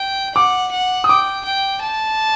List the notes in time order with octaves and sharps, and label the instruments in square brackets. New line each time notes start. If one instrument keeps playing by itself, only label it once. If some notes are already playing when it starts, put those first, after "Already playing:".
Already playing: [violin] G5
[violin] F#5 [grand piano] D6
[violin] F#5
[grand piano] D#6
[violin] G5 [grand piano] D6
[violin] G5
A5